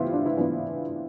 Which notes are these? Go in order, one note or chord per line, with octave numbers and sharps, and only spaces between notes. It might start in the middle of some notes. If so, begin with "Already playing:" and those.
Already playing: E3 B3 E4 F4 G4 B4 C5
D4
E4
E3 B3 D4